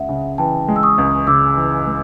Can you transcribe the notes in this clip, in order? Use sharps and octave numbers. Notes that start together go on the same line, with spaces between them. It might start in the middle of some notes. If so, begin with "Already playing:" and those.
Already playing: C#2 G#3 E5 F#5
C#3
E3 G5 A5
G#3
E6
C#6 D#6
C#2
C#3 D6 E6
E3
G#3